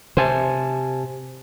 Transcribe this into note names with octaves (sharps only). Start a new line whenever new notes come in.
C3 C5 G#5 A5